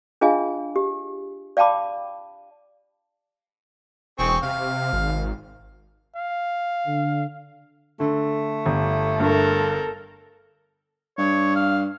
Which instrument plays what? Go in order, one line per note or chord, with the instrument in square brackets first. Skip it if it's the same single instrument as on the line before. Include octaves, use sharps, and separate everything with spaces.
[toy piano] D4 F4 G#4 D#5 F5 G#5
G4
D5 F5 G5 A5 B5 D6
[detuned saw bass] E1 [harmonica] C4 G#4 C#6
[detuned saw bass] C3 [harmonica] F5
[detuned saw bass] G#1
[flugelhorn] F5
[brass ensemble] D3
[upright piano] D3 [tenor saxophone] A3
[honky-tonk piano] G1
[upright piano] G2 [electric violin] A4 A#4
[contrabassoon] G2 [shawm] C#5
[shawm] F5